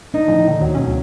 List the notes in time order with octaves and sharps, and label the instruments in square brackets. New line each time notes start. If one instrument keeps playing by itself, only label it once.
[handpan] D4 [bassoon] D#4
[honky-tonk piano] A2 [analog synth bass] F3
[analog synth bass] A#2 [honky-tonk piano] D#3
[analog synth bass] D#2 [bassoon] F#3
[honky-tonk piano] B1 [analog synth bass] C#4
[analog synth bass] D2